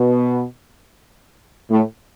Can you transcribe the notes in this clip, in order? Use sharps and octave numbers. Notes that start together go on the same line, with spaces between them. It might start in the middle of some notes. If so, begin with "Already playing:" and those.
Already playing: B2 B3
A2 A3